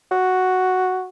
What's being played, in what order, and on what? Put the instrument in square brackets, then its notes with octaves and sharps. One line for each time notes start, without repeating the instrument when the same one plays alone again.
[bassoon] F#4